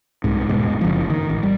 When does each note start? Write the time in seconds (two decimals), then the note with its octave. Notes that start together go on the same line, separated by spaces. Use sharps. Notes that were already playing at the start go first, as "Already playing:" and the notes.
0.24 C2 G#2
0.49 D#1 B2 G#3
0.81 F#1 F3
1.10 D#3
1.30 A1
1.43 G3